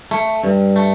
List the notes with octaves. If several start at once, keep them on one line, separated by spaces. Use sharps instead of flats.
A3
G2
A3